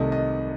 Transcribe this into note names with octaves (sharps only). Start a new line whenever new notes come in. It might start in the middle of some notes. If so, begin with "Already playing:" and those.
Already playing: C2 C3 D#3 A3 D#5
D#5